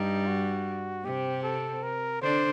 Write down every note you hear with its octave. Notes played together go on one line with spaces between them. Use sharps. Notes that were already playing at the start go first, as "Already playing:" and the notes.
Already playing: G2 G3 D#4
F#4
C3 C4 G4
A4
A#4
D3 D4 C5